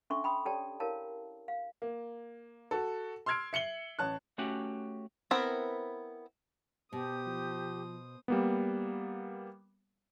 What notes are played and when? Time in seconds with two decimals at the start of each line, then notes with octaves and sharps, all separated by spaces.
0.10 C#4 D4 A4 E5 C6 C#6
0.24 G5 B5 C6 D#6
0.46 G4 A4 C#5 D5 G5 A5
0.80 E4 G4 A#4 C#5 F5 A5
1.48 F5
1.82 A#3
2.71 F#4 A4
3.26 C6 E6 F6 G#6 C7 D7
3.53 E5 C#7 F#7 G7
3.99 A1 C#5 A5 F#6
4.38 A3 C#4 F#4 G4 F#5
5.31 B3 C4 E4 A#4
6.93 B2 G4 C5 D#6
7.26 F3
8.28 G3 A#3 B3